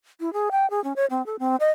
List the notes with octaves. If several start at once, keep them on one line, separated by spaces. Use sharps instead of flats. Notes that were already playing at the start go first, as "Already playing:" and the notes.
E4
G#4
G5
G#4
C#4
C#5
C4
A4
C4
D#5